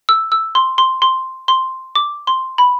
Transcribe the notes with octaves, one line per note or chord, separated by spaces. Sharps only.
E6
E6
C6
C6
C6
C6
D6
C6
B5